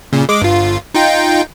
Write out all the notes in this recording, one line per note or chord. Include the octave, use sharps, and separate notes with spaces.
A#2 C#3
G#3 D6
G1 F4
D#4 F4 G5